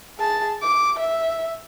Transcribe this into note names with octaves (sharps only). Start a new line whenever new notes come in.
G#4 A5
D6
E5